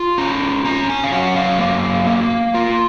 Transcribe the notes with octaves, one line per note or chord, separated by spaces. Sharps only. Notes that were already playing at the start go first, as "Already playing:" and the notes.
Already playing: F4
C#4 A#5
C#4 A#5
G#5
F5
F#3 F#5
F5
A#3
A#3
F4